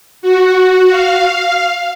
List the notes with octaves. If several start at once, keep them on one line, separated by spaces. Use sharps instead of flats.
F#4
F5